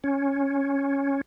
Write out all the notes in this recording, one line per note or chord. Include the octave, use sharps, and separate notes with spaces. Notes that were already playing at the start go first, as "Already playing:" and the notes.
C#4